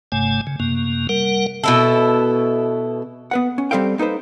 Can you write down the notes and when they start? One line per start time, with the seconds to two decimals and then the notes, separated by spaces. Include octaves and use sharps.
0.12 F#1 G2 C3 A3 G#5
0.47 C#3
0.60 F#2 C3 A#3
1.09 G3 A#4 F#5
1.64 B2 E4 A4
3.31 B3 B4 F#5
3.58 C#4
3.71 G3 C4 A4 C5 F5 G5
3.98 A#3 D#4 A4 B4 C5